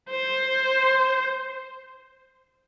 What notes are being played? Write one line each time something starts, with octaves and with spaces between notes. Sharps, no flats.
C5